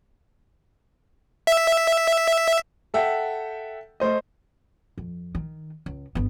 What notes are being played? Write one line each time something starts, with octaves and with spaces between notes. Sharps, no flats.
E5
A4 E5 F#5 G5
A3 C5 D#5
F2
D#3
C#2
G1 B3